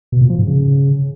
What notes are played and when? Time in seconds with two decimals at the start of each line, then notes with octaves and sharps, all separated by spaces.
0.12 B2
0.21 A#2
0.30 F3
0.38 G#2
0.47 C#3